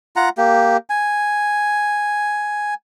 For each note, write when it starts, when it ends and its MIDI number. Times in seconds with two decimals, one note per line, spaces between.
0.16 0.29 65
0.16 0.29 78
0.16 0.29 82
0.38 0.77 58
0.38 0.77 67
0.90 2.74 80